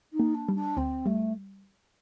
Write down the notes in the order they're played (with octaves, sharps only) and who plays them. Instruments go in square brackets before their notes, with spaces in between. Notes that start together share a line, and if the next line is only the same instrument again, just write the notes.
[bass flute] D#4
[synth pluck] A#3
[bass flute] D4
[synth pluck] G3
[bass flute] D4
[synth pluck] D2 [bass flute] C4
[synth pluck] G3 [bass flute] A3